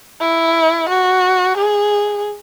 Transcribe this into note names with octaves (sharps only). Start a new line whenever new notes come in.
E4
F#4
G#4